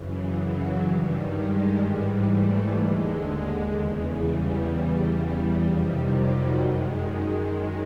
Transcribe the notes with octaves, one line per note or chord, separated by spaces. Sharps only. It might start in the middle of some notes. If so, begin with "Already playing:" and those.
Already playing: F#2 C#3 E3
F#3
G2 D#3 G3
G#3
G#2 E3 G3
A3
D#2 D3 G#3
E2 C#3 E3
G3
E2 C#3 E3 G3
G3
F2 C3 D#3 G3
F#3
F#2 D#3 G#3